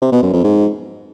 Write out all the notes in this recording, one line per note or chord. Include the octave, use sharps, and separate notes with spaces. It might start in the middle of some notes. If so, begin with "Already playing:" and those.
C3
B2
F#2
F2
G#2